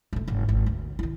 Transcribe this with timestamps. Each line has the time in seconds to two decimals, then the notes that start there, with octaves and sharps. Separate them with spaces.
0.13 D1 A3
0.28 F#1 G#2
0.49 G#1
0.66 D2
0.99 D#3 E4